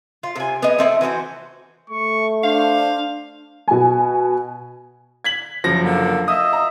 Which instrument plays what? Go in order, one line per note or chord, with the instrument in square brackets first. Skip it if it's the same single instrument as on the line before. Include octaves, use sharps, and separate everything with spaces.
[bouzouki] F4
C3 G#5
B3 G#4 D#5
A3 C4 E4
E3 F#4 B4 C5
[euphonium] A3 [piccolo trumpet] C#6
[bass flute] D4 [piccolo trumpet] C5 [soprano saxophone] F5
[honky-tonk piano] B2 G#5
[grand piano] G#6 B6 F#7
F#1 F3 A#6
[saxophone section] D3 A#3
[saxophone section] F4 D#5 E5 [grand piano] D#6
[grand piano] A#5